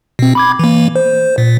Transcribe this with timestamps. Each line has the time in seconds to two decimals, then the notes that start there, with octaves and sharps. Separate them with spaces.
0.19 B2 C4
0.35 B5 D6 G#6
0.59 E3 A#3
0.96 C5
1.38 A#2